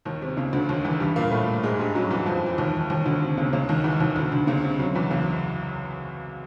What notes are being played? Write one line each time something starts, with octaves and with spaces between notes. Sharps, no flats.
D#2 D#3
C3
C#2 C#3
D2 D3
D#2 D#3
E2 E3
G2 G3
A#2 A#3
A2 A3
G#2 G#3
G2 G3
F#2 F#3
E2 E3
F2 F3
E3
D#2 D#3
D#2 D#3
D2 D3
C3
C#2 C#3
C#2 C#3
D#2 D#3
E2 E3
D#2 D#3
D2 D3
D2 D3
C#2 C#3
C3
F#2 F#3
E2 E3
C#2 C#3